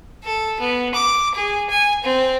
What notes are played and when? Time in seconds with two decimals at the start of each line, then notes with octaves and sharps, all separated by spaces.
0.24 A4
0.60 B3
0.94 D6
1.35 G#4
1.70 G#5
2.03 C4